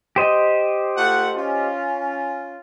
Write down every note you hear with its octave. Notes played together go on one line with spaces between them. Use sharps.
G4 C5 D#5
A3 F4 F#5
C#4 F4